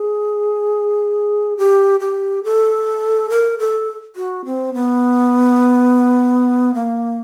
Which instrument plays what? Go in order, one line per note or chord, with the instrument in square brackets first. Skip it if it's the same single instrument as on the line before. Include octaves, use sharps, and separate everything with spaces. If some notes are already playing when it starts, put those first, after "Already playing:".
Already playing: [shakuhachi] G#4
G4
G4
A4
A#4
A4
F#4
C4
B3
A#3